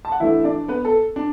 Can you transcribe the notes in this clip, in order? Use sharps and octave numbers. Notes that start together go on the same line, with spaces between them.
A5
F#5
E3 A3 D4 E4 E5
D4 D5
B3 B4
A4
D4